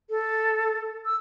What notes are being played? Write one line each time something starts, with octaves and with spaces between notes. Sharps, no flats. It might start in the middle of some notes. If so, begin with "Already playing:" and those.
A4
E6